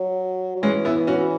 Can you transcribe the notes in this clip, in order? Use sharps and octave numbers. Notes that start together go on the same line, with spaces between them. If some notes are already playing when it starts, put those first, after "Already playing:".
Already playing: F#3
F#3
E3 G#3 C#4
B3 E4
C#4 F#4